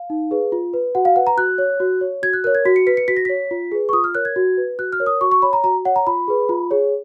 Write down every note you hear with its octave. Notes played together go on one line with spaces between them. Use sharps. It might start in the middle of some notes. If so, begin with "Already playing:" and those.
Already playing: F5
D#4
G#4 B4
F4
B4
F#4 F#5
F5
B4 F#5
A#5
F#4 F#6
C#5
F#4
C#5
F#4 G#6
F#6
A#4 C#5 F#6
G#6
F#4 B6
C#7
B4 B6
C#7
F#4 B6
A#6
C#5 B6
F4
G#4 B4
C#6
F4 D#6
F6
A#4 C#5 F#6
G#6
F#4
B4
F#4 F#6
F6
A#4 C#5
D#6
F#4 C#6
C#6
C#5 B5
A#5
F#4 A#5
C#5 F#5
A#5
F4 B5
G#4 B4
F4
G#4 C#5